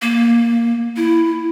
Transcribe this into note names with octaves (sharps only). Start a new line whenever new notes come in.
A#3
E4